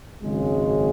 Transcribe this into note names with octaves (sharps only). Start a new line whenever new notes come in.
G#1 F#2 C#3 G#3